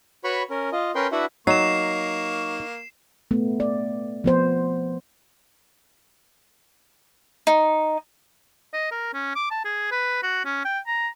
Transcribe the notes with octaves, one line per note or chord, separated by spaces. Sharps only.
F#4 B4 C#5 B5 C#6
C#4 A#4
F4 D#5
C#4 A#4 B4 G5 C6
D4 E4 F#4 B4 E5 F#5
F#3 A#3 D#4 C#6 C7 E7
A3 B3
D5
F3 B3 C5
D#4
D#5
A#4
C#4
D6
A5
G#4
B4
F#4
C#4
G5
A#5